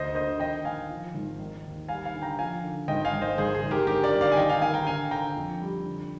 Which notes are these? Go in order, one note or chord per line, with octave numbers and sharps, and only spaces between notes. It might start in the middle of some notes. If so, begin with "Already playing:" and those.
Already playing: D2 C5 D#5
D3 C5 D#5
D#3 D#5 G5
D#3 F5 G#5
F3
G#1
D#3
D#2
G3 F5 G#5
F5 G#5
D3
G5 A#5
F3 F5 G#5
D3
G#1 D#5 G5
F5 G#5
G#1
C5 D#5
G#1 G#4 C5
G#4
G#1
G4 A#4
D3 G4 A#4
A#4 D5
G1
D5 F5
G#5
D#3 D#5 G5
F5 G#5
D#3 F5 G#5
G5 A#5
D3 F5 G#5
D3 G5 A#5
F2
G3
D3